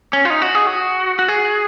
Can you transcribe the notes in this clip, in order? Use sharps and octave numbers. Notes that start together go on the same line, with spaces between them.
C#4
F4
D#4
F#4
G#4
F#4
F#4
G#4